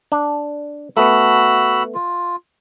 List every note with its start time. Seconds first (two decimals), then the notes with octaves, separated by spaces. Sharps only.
0.12 D4
0.97 A3 B3 F#4 B5 E6
1.95 F4